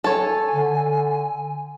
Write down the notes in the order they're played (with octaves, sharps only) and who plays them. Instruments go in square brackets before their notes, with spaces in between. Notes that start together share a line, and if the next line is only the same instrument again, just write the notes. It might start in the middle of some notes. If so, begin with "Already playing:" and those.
[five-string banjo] A4 C#5 [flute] G#5
[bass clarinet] D3